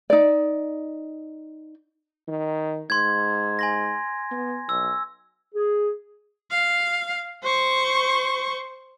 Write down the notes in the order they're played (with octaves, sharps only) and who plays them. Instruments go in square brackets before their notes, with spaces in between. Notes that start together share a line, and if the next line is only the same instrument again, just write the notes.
[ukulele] D#4 D5
[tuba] D#3
[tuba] G#2 [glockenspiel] C6 G#6
[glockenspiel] G#5 C6 A#6
[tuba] B3
[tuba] B1 [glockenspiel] E6
[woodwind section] G#4
[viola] F5
C5 C#6